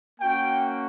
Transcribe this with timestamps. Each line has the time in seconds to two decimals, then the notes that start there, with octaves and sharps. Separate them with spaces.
0.20 A#3 C#4 F#4 G5